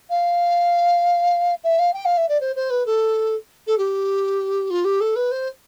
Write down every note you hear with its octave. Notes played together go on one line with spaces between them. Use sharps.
F5
E5
F5
G5
F5
E5
D5
C5
C5
B4
A4
A4
G4
F4
G4
A4
B4
C5